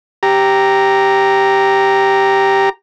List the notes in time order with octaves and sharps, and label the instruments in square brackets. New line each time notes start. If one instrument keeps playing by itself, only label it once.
[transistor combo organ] G4 A#5